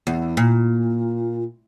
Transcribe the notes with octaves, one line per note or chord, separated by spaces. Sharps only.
E2
A#2